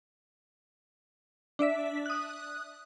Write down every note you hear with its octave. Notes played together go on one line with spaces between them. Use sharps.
D4 D5 E5 B6
D#6 F#6